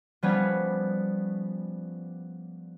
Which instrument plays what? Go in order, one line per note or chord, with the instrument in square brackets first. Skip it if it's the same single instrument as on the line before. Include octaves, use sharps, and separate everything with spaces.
[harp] F3 G3 B3 C#4